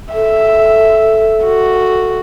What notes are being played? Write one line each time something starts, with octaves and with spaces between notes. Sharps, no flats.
A4 E5
F#4